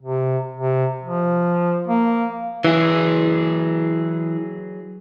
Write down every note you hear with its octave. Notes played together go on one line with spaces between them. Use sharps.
C3
C3
F3
A#3
E3 F#3 G#4